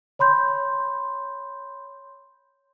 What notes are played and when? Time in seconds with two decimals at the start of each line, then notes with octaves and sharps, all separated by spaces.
0.19 C#5 B5 C6 G6